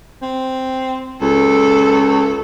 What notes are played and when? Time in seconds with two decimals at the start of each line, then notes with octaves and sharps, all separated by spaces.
0.22 C4
1.22 C#2 A4